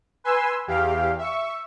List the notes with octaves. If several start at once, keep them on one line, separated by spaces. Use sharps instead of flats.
B4 G#5 C6 E6
E2 G4 F5
E5 C#6